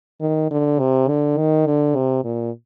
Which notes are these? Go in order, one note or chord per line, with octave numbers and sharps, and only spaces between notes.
D#3
D3
C3
D3
D#3
D3
C3
A#2